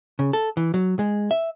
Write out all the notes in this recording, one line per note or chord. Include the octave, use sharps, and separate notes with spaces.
C#3
A4
E3
F#3
G#3
E5